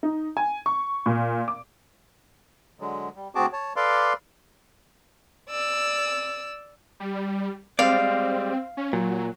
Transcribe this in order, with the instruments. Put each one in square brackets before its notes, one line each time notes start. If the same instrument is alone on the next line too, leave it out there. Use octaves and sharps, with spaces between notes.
[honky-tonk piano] D#4
G#5
C#6
A#2
D6
[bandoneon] D3 F#3 G#3
G3
D2 C4 F#4 G#4 A5 D6
C#5 A5
A4 B4 D5 F5 C6 D6
[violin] D5 E6
[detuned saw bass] G3
[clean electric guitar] G3 G#3 D5 [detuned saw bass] C4 [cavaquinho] F5
[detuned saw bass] C#4
[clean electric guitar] A#2 [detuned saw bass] F#3